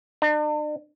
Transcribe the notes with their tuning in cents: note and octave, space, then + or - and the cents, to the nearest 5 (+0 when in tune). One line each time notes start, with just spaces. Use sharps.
D4 +45